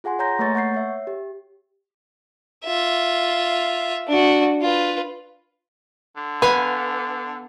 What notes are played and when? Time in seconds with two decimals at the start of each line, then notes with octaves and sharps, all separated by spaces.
0.04 F4 G#4 F#5 G#5 C6
0.19 C#5 G#5 A#5 C6 G6 A#6
0.39 A3 A#3 B4 C#5 C#6 A6
0.55 F#5 C#6 G6 C7
0.74 C#5 E5
1.07 G4
2.65 F4 E5
4.07 D4 F#4
4.61 F4 B4
6.16 D3
6.42 B3 B4 F5 G#5